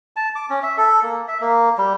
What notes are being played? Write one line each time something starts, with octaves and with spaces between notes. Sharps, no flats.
A5
D6
C#4
E5
A4
A#3
E5
A#3
G3